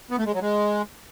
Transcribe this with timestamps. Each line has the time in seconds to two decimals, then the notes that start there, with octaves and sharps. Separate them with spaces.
0.11 B3
0.18 A3
0.26 G#3
0.34 F#3
0.41 G#3